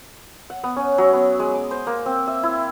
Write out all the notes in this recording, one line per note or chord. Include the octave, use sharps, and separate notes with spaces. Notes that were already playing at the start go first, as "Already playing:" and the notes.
F#5
B3
C#4
F#3
B3
G#3
D6
C5
A#3
C4
E5
E4